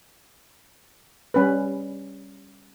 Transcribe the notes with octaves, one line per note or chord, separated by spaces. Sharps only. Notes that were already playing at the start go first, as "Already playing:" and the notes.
G3 C#4 B4